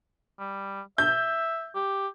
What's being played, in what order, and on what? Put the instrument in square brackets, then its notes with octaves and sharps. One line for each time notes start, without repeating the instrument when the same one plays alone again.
[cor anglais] G3
[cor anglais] E5 [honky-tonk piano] G6
[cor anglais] G4